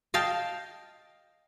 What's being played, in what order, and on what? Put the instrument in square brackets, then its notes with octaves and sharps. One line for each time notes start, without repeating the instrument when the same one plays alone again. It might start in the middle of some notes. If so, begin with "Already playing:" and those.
[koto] D#5 F5 G5 A5